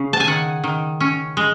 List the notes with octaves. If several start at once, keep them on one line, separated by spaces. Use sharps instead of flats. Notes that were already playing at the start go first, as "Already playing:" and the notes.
Already playing: C#3
A5
G#5
D#3 F#5
D#3
C#4
G#3